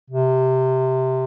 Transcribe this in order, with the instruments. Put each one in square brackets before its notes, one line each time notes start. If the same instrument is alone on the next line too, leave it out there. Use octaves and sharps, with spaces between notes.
[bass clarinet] C3